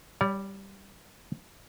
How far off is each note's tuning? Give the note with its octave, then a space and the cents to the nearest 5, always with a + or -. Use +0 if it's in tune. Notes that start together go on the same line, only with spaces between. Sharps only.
G3 +0 C#5 +40